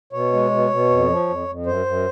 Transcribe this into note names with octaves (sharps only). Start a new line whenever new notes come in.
B2 C#5
G#3
B2
B2
F2
F3
F2
F2
F#2 C5
F#2